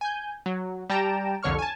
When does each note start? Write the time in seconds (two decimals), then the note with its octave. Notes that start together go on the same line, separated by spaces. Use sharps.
0.01 G#5 G6
0.46 F#3
0.90 G3 G5 A5 A#5 D7 E7
1.43 C2 F2 D3 C#5 C#6 F6
1.59 G#5 A5